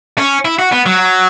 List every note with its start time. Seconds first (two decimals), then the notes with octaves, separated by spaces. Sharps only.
0.18 C#4
0.45 E4
0.59 F#4
0.72 B3
0.86 F#3